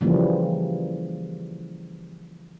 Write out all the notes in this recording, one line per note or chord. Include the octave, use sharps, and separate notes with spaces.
C#3 E3 F3 G3 A#3